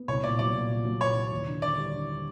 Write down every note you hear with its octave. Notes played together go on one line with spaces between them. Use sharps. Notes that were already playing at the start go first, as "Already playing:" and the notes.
Already playing: B3
C2 C#5
A#2 D5
F#3 D5
A#2
A#2
F#3
A#2 C#5
F#3
D#2
D3
D3 D5
G3
D3